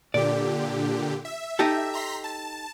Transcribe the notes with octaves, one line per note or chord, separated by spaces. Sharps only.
A#2 D3 G4 D5
E5
D#4 G4 A4
A#5 C6 B6
A5